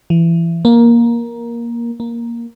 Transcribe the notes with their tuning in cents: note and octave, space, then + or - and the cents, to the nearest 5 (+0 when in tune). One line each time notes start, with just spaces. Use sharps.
E3 +25
A#3 +10
A#3 +5